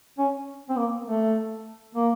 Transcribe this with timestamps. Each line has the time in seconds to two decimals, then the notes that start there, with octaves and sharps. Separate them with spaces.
0.18 C#4
0.69 C4
0.76 A#3
1.07 A3
1.95 A#3